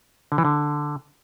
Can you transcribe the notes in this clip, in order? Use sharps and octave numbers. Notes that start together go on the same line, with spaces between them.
D3
E3
D3